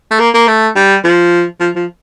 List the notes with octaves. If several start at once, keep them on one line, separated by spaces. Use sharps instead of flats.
A3
A#3
A#3
A3
G3
F3
F3
F3